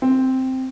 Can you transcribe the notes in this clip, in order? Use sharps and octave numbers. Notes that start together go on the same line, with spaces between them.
C4